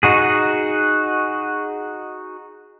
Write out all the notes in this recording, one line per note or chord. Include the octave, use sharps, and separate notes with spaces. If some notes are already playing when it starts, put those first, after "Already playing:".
D#4 F#4 G#4